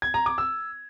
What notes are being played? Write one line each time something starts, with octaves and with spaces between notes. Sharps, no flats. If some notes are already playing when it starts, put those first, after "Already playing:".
G#6
A#5
D6
E6